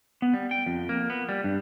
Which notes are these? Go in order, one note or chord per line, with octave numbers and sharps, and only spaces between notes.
B3
G3
G5
F2
A#3
B3
G3
G2